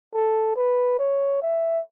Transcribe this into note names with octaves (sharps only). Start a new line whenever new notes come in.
A4
B4
C#5
E5